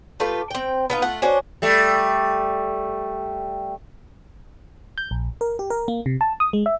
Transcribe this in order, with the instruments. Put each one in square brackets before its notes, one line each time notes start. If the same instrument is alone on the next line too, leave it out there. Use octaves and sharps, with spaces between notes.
[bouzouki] A3 F4 G4 B4
C4 G5
B3 D#4 F4
A3 F4 F#5
C#4 D4 F#4 C5
[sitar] G3 A3
[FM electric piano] G6
A#1
A#4
G4
A#4
A#3
C3
A5
D#6
G#3
E5